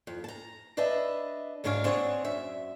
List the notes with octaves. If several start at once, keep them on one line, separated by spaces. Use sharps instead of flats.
F2
A5 A#5
D4 B4 D#5 E5 A5
D2 G#2 D4 C#5 F5
C4 D4 G#4 C#5 E5 F#5
F#2 E5